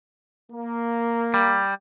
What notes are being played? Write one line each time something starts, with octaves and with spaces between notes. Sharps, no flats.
A#3
G3